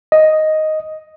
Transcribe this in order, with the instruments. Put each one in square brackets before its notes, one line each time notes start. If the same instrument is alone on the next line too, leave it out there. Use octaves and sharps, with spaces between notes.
[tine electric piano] D#5